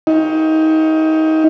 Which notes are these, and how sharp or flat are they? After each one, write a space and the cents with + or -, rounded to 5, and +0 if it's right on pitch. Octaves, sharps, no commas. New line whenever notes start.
D#4 +25